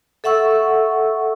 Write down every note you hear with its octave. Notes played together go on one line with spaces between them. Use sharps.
A4 E5 F#5 C#6 E6